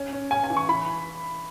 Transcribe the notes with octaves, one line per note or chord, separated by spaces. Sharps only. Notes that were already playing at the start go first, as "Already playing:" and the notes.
Already playing: C#4
C#4
C#4 G#5
G#5
E3
C#6
E3 B5